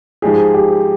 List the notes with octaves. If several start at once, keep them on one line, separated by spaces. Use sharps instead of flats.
G#2 F3 G#3 D#4 G4 G#4
G4